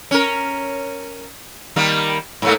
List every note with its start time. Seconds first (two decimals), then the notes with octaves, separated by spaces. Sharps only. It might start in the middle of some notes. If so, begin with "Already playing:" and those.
0.11 C#4 A#4
1.76 D#3 G3 A#3
2.42 G#2 A3 A#3